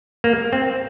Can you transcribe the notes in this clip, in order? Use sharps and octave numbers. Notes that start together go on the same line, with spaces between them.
A#3
C4